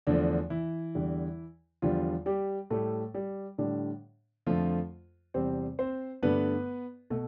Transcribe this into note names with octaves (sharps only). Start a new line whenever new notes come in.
E2 D3 F3 A3 D4
E3 E4
E2 D3 G3
E2 D3 F3 G3 F4
G3 G4
A2 G3 A3 A4
G3 G4
A2 D3 G3 D4
F2 D3 F3 A3 F4
E2 C3 G3 C4 C5
C4 C5
G2 D3 A3 B3 B4
B2 A3 A4